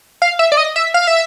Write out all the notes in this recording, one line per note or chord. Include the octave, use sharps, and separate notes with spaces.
F5
E5
D5
D#5
E5
F5
E5